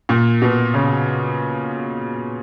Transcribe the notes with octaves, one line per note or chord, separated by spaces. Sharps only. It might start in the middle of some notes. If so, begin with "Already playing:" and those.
A#2
B2
C#3